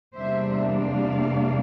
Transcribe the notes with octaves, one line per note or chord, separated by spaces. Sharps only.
E2 C3 G3 A#3 D4 C5 E5
D5 F5